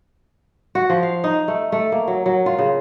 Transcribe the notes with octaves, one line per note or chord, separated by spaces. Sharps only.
F#4
F3
F5
D#4
A3
A3
A#3
F#3
F#3
F4
C#3